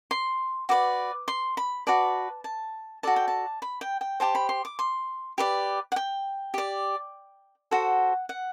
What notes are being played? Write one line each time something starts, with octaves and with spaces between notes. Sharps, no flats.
C6
F#4 B4 D5 D6
C6
B5
F#4 B4 D5 A5
A5
F#4 A4 D5 A5
G5
A5
B5
G5
G5
G4 C5 A5
B5
C6
D6
C6
G4 B4 D5
F#5
G5
G4 D5
F#4 A4 C5 F#5
F#5